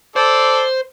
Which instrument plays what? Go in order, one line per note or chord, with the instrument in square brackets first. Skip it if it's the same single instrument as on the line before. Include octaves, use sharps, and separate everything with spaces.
[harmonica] A4 D5 [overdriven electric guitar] C5